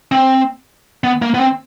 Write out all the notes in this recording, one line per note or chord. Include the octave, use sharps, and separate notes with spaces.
C4
B3
A#3
B3
C4